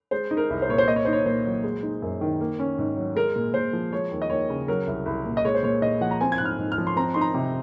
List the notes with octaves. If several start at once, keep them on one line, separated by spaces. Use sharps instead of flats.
G#3 C5
D#4
A#4
C2
C5
A#2 C#5
C5
A#3 D#5
C#5
D#4 C5
C#5
A#2 C5
F#3
G#3
D#4
F#2
D#3
A#3
C#4
G#2
F#3
G#3 A#4
A#2
A#2 C5
F3
G#3 C#5
D#2
D#5
D#2 C#5
C#3
F#3 A#4
C2
C2
A#2
D#5
G#3 C#5
C5
A#2 C#5
A#2 D#5
F3 F#5
A#5
C4 G#5
G#6
G#2 F#6
F6
G#2
F6
F3
C6
C4 A#5
D#4 C6
A#5
C3